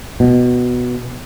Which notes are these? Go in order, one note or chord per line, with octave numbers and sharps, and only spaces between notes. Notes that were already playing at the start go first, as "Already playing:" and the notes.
B2